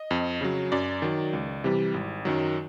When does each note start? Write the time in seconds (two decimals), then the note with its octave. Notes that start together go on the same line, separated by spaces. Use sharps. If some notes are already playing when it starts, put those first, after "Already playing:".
Already playing: D#5
0.11 F2
0.41 C#3 F#3
0.72 F#2 D5
1.02 D#3 F#3
1.33 C#2
1.64 C3 E3 G3
1.94 G#1
2.25 F#2 D#3 F#3